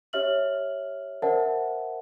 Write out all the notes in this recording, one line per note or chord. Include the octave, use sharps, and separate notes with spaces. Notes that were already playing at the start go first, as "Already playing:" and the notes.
G4 C#5 E5 F6 F#7
A#4 C5 D5 E5 F#5 A5